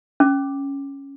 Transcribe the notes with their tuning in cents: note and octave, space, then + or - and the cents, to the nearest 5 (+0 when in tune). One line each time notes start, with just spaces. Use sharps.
C#4 +0 D6 +0